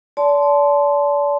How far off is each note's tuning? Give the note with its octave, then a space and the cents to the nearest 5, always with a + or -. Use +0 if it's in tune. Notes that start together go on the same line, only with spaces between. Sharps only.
D5 -35 A5 -20 C6 -15